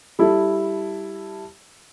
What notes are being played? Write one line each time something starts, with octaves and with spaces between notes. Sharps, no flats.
G3 E4 A4